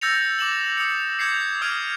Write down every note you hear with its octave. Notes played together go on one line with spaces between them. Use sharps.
E6 G6 A6 A#6 C#7 F7
D6 E7 F#7
D#6 C#7
D6 G6 G#6 C7 C#7
D6 D#6 F6 G#6 D7 D#7